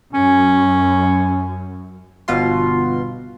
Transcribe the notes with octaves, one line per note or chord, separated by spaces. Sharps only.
F#2 C#4
G1 B2 F4 C6